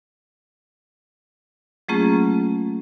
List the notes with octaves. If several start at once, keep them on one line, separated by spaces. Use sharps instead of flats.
F#3 A3 A#3 C#4 F4 G#4